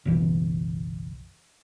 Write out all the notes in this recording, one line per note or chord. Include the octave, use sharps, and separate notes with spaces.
F#1 B1 E3